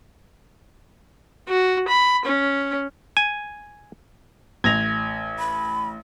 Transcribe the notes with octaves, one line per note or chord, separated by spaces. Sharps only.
F#4
B5
C#4
G#5
A1 G#6 A#6 F7
B5